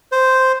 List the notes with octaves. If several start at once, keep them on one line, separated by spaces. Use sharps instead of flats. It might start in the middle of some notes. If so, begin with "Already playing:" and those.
C5